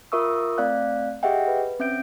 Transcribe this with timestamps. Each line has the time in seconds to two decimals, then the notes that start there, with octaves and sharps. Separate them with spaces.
0.12 F4 A#4 E5 C#6 D#6 E6
0.58 A3 C4 D5 F5 F#6
1.23 G4 G#4 D#5 E5 F#5 G5
1.48 B4
1.79 C4 C#4 E5 G6 D7